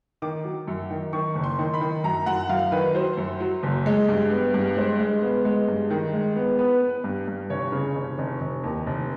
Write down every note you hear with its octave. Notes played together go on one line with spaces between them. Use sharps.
D#3 D6
F#3
F#2
D#3
D#3 C#6
F#1
C6
D#3
B5
D#3
F#2 A#5
F#2 F#5
F#2 F5
D#3 B4
F#3 C5
F#2
F#3
F#1
G#3
G2
B3
G2
G#3 C5
G#3
B3
G#3
G2
D#3
G#3
B3
B3 B4
B3
B4
G2
G2
F1 C#5
C#3
F1
F1
F1
D#2
F1